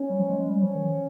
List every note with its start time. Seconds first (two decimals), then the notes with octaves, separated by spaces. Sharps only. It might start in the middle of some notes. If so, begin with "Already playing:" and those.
Already playing: C#4
0.10 G3
0.20 F3
0.29 G#3
0.39 G#3
0.49 G3 C#4
0.63 F3
0.76 D#3
0.88 F3